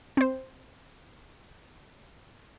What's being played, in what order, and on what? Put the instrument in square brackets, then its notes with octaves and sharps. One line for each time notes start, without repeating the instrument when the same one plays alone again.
[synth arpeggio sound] C4 C5